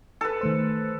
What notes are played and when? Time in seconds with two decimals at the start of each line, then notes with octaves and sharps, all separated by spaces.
0.21 A4 B4
0.41 D#3 A3 C5